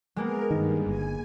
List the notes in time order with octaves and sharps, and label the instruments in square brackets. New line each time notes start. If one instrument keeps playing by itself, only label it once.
[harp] G#3 A#3 B3 [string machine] A#4
[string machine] G2 [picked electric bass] D#3
[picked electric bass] G1 [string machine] G#5